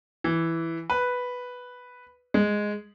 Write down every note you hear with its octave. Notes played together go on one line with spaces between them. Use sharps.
E3
B4
G#3